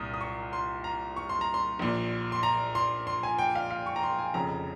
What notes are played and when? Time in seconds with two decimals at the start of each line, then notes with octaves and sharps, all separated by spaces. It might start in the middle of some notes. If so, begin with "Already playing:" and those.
Already playing: C2 A#2 D#6
0.14 D#6
0.21 C#6
0.53 C6
0.84 A#5
1.16 C#6
1.29 C6
1.41 A#5
1.54 C6
1.79 A#1 A#2
2.32 C6
2.43 A#5
2.75 C6
3.07 C6
3.23 G#5
3.38 G5
3.55 F5
3.71 F5
3.86 C#6
3.96 A#5
4.03 C6
4.18 G#5
4.34 F1 F2 C#3 A#5